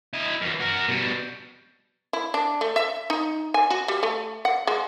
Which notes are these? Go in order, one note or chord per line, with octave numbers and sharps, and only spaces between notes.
E4 D#5
F#2 E3
F#4 A#4
B2 G3
E4
D4
A3
E5
D#4
G#5
F#4
G3
A3
F#5
G#3